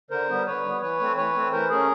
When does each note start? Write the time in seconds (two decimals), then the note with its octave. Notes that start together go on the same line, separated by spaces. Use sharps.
0.11 D3 A#4 C5
0.28 G3 B3
0.46 D3 B4 C#5
0.63 G3 B3
0.81 E3 B4 C#5
0.99 A3 C4
1.16 E3 B4 C#5
1.34 A3 C4
1.52 E3 A#4 C5
1.69 A3 C#4 G#4 A#4